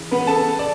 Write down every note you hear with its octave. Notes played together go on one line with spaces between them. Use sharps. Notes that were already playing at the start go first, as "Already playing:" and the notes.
Already playing: C#3 E3 E4
B3 B4
A4 A5
D5